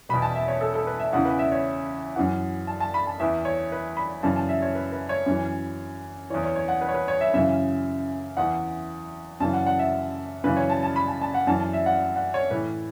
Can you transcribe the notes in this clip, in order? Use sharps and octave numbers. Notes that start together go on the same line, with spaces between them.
E2 B2 B5
A5
E5
C#5
A4
A4
B4
E5
E2 C#3 E3 F#5
B4
E5
C#5
F#2 E3 F#5
A5
A5
B5
A5
E2 E3 E5
C#5
B4
B5
F#2 C#3 E3 A5
A5
E5
C#5
B4
B4
C#5
F#2 E3
E2 E3 C#5
C#5
C#5
F#5
B4
C#5
B4
C#5
E5
F#2 C#3 E3 E5
E2 E3 F#5
F#2 C#3 E3 A5
F#5
F#5
E5
F#2 C#3 E3 B4
C#5
A5
A5
B5
A5
A5
F#5
F#2 E3 A5
A5
E5
F#5
F#5
C#5
A2 E3 B4